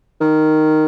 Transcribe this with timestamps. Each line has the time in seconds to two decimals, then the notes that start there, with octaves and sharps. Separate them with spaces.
0.21 D#3